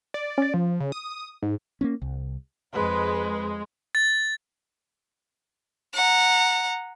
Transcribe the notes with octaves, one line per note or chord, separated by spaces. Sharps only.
D5
C#4 A6
F3
C#3
D#6
G#2
A#3 C4 C#4
C2
F2 G#3 B4
A6
F#5 A#5